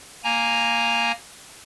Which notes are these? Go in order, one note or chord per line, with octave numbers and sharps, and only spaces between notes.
A#3 G#5 A#5